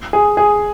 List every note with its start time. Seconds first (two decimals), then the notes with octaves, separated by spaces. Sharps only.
0.13 G#4
0.37 G#4